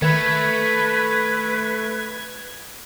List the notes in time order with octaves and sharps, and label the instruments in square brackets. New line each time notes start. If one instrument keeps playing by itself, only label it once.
[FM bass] D#3 [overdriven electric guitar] A3 [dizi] B4 [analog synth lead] G#6